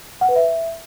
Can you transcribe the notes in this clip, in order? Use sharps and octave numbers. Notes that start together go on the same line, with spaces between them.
F#5
B4
E5